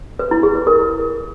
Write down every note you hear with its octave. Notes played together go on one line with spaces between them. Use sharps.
B4
E4
G#4
B4
A#4